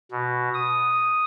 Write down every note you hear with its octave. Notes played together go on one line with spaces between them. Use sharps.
B2
D#6